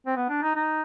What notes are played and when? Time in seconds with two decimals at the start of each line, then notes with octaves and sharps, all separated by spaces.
0.06 C4
0.16 B3
0.29 D4
0.42 D#4
0.55 D#4